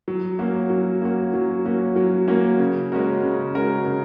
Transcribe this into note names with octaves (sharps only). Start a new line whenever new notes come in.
F#3
A#3 C#4 F#4
F#3
A#3 C#4 F#4
F#3
A#3 C#4 F#4
F#3
A#3 C#4 F#4
C#3
G#3 C#4 F#4 A#4
C#3
G#3 C#4 F#4 A#4
C#3